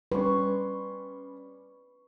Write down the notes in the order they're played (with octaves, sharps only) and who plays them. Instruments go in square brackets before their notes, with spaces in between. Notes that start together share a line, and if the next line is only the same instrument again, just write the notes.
[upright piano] G3 C#4 [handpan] B4 [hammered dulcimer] C6 C#6